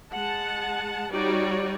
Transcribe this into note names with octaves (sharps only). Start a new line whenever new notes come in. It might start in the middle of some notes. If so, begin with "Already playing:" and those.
G#3 F#5 A5
G3 D#4 F#4 C#5 D5